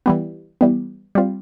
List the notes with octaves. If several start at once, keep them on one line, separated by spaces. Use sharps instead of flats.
E3 G3 B3
E3 G3 B3
G3 C4 F4